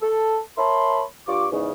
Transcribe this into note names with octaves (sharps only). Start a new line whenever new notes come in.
A4
A#4 C#5 E5 A5 B5 C6
G2 F4 G4 C#6 D6
E2 G#2 C#3